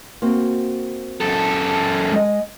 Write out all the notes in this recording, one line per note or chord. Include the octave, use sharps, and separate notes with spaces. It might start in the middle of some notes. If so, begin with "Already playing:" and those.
A#3 C4 F#4
F#2 A4
G#3 D#5